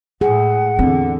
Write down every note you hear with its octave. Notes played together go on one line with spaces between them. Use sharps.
A2 G#4 F#5
E2 D3 C4